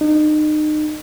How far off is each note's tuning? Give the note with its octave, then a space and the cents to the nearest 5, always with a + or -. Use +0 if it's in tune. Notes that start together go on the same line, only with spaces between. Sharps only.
D#4 -35